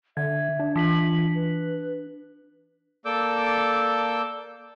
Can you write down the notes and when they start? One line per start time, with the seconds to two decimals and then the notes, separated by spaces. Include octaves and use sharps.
0.17 D3 E5 G#6
0.59 D4
0.76 E3 F4 B6 F#7
1.35 B4
3.05 A#3 A4 D5 D6 E6 G6